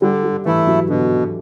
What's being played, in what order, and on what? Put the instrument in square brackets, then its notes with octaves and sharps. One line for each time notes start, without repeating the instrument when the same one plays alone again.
[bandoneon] D3 [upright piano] G3
[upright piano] G3
[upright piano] E3 [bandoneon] A3 E4
[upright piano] F#3
[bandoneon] B2 [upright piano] D3